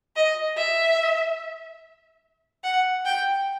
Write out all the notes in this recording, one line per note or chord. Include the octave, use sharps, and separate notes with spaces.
D#5
E5
F#5
G5